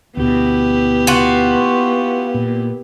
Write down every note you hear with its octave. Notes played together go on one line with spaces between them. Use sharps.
D2 B2 B3 E4 G4
F4 F#4
A#2